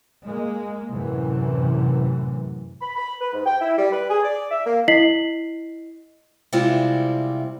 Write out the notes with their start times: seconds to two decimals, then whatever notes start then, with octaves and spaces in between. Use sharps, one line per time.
0.24 G#3 A#3
0.91 F#2 A2 C3 E3
2.82 B5
2.96 B5
3.21 B4
3.33 G#2
3.46 G5
3.61 E4
3.78 G3
3.93 B4
4.10 G#4
4.23 D5
4.51 E5
4.67 A#3
4.88 E4 D#5 B6 C7 F#7
6.53 C3 G3 G#3 C4 E4 F4